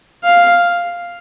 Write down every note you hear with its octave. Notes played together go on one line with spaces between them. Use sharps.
F5